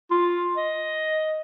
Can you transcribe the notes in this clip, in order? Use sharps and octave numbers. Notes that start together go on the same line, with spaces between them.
F4
D#5